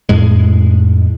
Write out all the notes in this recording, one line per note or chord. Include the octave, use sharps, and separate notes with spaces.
F2 A2 G#3